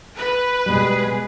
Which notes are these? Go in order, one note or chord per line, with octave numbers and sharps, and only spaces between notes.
B4
B2 G3 G#3 G#4